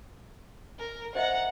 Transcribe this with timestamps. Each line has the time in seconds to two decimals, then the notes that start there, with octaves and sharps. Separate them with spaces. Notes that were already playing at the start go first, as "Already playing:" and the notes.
0.79 A#4
1.15 C5 D#5 E5 F#5 A#5